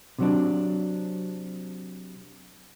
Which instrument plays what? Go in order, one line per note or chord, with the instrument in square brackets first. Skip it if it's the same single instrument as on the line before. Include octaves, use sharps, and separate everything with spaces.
[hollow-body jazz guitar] C3 F#3 D4